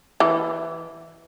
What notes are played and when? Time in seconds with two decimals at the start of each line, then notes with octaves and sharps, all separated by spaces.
0.20 E3